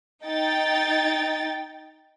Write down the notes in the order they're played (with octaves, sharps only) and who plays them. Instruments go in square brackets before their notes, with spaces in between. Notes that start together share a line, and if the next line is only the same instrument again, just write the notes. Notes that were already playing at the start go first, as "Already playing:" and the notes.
[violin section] D#4 G5 A6